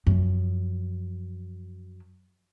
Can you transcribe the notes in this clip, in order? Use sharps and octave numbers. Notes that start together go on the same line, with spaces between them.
F#2 F3